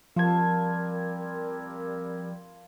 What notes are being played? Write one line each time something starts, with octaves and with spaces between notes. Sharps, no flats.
F3 G3 C4 F4 A#4 A5 G#6